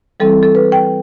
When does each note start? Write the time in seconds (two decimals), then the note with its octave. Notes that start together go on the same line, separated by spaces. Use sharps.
0.20 E3 G3 C4 E4 A4
0.43 A4
0.55 B4
0.72 G5